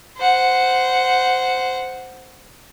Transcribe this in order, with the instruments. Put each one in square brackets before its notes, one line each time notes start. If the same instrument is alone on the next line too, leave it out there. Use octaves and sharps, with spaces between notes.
[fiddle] C5 F#5